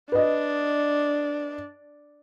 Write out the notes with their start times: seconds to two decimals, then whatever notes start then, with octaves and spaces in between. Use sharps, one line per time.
0.12 D4 B4 D#5